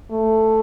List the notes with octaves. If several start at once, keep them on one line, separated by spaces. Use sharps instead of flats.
A3